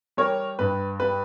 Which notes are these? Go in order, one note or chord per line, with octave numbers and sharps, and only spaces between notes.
G3 A#4 C#5
G2 B4
G3 B4